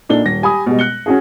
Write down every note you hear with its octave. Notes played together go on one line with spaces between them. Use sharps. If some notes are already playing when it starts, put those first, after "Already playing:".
A#2 D4 D#4 A4 G7
D#1 A#6
G4 G#5 B5 D#6
B2 G3 G#3
F#6 C#7 G7
C#4 F#4 G#4